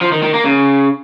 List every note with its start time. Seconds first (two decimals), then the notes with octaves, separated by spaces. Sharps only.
0.01 F3
0.12 D#3
0.23 D#3
0.33 A#3
0.44 C#3